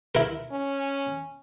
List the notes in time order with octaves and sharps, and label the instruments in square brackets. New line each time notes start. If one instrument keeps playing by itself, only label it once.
[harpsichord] E4 A#4
[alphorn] C#4